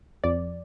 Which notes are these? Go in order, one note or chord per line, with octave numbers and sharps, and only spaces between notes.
F2 D5